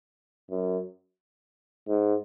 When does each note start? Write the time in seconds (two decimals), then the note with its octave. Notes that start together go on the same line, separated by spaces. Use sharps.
0.51 F#2
1.88 G#2